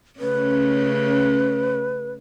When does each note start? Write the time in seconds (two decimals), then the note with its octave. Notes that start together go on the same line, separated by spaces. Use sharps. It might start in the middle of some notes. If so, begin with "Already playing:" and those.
0.19 C#3 A3 C#4 B4